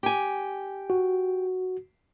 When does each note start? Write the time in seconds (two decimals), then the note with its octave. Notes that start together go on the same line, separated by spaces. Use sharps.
0.03 G4 G#5
0.90 F#4